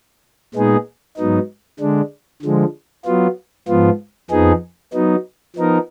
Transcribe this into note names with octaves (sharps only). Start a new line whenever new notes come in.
A#2 G#3 B3 D#4 G#4
G#2 F#3 B3 D#4
D3 G#3 D4
D3 F3 G#3
F#3 B3 F4
G#2 F3 B3 F4
F2 F3 B3 D#4 G#4
F#3 B3 D#4
F3 B3 D#4 A#4